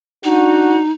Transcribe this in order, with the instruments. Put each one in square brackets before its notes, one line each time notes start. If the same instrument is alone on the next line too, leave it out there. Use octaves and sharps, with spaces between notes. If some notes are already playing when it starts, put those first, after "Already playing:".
[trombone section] D4 F#4 [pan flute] D#4